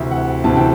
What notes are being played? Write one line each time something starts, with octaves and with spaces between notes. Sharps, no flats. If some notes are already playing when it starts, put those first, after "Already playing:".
Already playing: D2 C3 E3 E5
F#5
D2 C3 E3 A5
G5